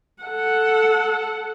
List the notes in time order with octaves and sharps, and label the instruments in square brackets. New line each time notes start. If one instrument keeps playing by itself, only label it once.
[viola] A4 F#5